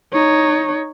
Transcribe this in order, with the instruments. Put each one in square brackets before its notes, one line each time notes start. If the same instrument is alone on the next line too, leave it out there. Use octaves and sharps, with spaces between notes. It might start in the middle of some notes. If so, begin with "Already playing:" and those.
[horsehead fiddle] D#4 C#5